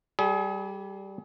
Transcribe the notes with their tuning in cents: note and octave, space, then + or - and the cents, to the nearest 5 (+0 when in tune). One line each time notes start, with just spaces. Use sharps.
G3 -10 G#4 +35